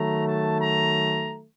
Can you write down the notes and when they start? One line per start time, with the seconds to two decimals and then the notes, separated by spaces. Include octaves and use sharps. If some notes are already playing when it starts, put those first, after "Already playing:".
Already playing: D#3 F#3 A3 A#5
0.27 A5
0.61 A#5